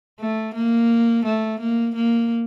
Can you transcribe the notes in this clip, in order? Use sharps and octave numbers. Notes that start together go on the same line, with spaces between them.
A3
A#3
A3
A#3
A#3